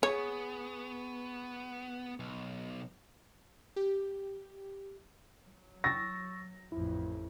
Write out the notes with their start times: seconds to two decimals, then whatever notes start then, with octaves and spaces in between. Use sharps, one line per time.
0.03 B3 G#4 C#5 C#6
2.20 B1
3.76 G4
5.46 F#3
5.84 C#6 E6 A6 A#6
6.72 A1 F2 E4